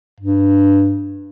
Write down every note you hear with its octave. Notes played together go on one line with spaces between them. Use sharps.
G2